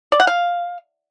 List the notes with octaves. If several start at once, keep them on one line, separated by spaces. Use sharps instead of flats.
D5
F#5
F5